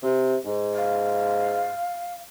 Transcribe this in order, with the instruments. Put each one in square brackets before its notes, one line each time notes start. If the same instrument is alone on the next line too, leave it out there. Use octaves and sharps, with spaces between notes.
[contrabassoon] C3
G#2
[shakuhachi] F5